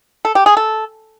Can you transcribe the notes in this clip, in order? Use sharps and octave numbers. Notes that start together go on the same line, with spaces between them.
A4
G4
G#4
A4